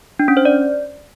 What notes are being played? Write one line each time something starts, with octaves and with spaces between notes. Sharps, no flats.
D4
C#4
C5
D5